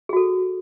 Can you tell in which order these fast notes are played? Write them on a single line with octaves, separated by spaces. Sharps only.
G#4 F#4 A4